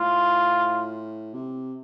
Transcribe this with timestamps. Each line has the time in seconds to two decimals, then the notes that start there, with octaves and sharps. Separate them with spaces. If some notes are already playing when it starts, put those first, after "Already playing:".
Already playing: A2 F4
1.34 C3